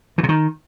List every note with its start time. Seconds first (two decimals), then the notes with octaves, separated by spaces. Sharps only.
0.18 E3
0.23 C3
0.29 D#3